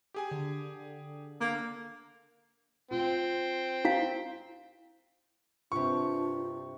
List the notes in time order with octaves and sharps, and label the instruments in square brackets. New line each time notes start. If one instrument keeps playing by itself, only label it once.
[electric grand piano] G4 G#4 G#5
[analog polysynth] D3
[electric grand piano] D3 [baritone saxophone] A#3
[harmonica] C4 [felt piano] F4
[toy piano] E4 F5
[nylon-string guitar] G2 C3 [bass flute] D4 [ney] F4 [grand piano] C#6